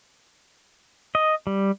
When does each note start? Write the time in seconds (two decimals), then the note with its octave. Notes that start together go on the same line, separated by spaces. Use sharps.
1.15 D#5
1.47 G3